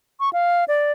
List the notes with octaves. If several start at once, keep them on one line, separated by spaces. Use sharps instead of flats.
C#6
F5
D5